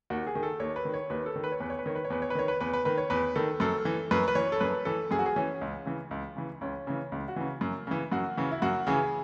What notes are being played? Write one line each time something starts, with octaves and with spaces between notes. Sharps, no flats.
D#2 F#4
G#4
D#3
A4
D#2 C#5
B4
D#3
C#5
D#2 B4
A4
D#3
B4
C#5
E2 B4
C#5
B4
D#3 C#5
B4
C#5
E2 B4
C#5
B4
D#3 C#5
B4
E2 B4
B4
D#3 B4
C#5
E2 B4
D#3 A4
F#2 A4
E3
F#2 B4
B4
E3 C#5
A4
F#2 B4
E3 A4
F#2 G#4
F#4
G#4
E3 C#4
C#2
C#3 E3
C#2
C#3 E3
C#2 C#4
C#3 E3
C#2
F#4
C#3 E3
F#2
C#3 E3
F#2 F#4
C#3 E3
E4
F#2 F#4
C#3 E3 G#4